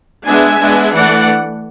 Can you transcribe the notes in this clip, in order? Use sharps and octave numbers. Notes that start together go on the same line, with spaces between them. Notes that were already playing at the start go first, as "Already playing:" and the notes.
G#3 B3 D4 E5 G#5
G#3 B3 D4
E3 A3 D4 D5 F#5